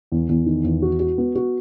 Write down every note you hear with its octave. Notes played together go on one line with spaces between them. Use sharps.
E2
E2
D#3
E2
F#4
F#4
B3
F#4